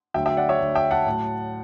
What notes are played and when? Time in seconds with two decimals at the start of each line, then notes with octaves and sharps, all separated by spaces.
0.14 D2 D3 F#3 E5 G5
0.26 E5 G5
0.37 D5 F#5
0.49 C#5 E5
0.60 D2 D3 F#3
0.75 E5 G5
0.91 F#5 A5
1.06 A2 F#3